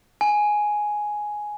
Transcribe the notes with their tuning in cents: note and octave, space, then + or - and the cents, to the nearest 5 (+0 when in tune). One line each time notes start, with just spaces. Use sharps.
G#5 +5